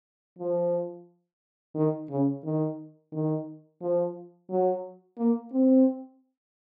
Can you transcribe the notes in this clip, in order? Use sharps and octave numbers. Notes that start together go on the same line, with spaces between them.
F3
D#3
C#3
D#3
D#3
F3
F#3
A#3
C4